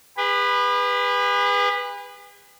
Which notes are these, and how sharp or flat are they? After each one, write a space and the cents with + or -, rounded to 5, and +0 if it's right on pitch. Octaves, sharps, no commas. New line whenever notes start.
G#4 -45 B4 +0